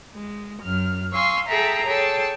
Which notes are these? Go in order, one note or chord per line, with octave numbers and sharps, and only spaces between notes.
G#3
F#2 F6
F5 G#5 C6 C#6 E6
G#4 A4 E5 G5 A5 A#5
G#4 A4 C#5 G5 A5